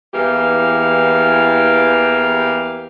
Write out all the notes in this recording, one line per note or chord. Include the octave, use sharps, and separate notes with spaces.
E2 E3 A#3 G4 F5